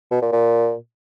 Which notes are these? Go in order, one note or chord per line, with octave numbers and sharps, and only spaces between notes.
B2
A#2
A#2